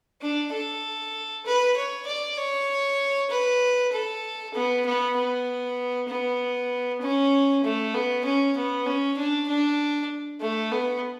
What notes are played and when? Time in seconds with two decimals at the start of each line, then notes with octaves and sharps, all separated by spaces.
0.21 D4
0.53 A4
1.46 B4
1.77 C#5
2.07 D5
2.37 C#5
3.31 B4
3.92 A4
4.54 B3
4.85 B3
5.16 B3
6.08 B3
7.01 C#4
7.64 A3
7.94 B3
8.25 C#4
8.57 B3
8.86 C#4
9.17 D4
9.48 D4
10.41 A3
10.72 B3